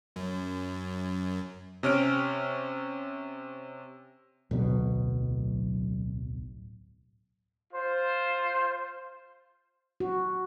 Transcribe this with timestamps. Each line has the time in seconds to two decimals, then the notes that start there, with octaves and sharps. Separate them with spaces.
0.16 F#2
1.83 C3 C#4 F6 D7
4.51 D1 B1 B2
7.73 F4 C5
10.00 F#4